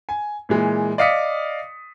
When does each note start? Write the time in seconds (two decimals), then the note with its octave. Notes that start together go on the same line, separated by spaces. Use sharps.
0.09 G#5
0.49 A#2 E3 G#3
0.98 D5 D#5 F5 D#6 B6 C#7